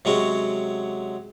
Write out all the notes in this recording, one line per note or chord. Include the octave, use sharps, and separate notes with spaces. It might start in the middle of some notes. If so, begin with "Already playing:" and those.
C3 F#3 G#3 C#4 F#4